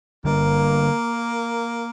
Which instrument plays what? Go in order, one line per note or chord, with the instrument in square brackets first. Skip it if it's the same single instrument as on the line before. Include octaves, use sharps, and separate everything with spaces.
[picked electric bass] D3 G3 D4 [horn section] A#3